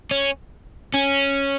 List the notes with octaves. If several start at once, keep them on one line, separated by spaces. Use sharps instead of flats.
C#4
C#4